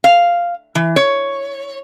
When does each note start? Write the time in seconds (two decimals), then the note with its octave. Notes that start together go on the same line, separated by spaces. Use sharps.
0.04 F5
0.75 E3
0.96 C#5